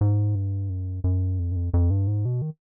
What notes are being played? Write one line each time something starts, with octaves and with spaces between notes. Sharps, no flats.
G#2
G2
F#2
F#2
F2
F#2
F2
F2
G2
G#2
B2
D#3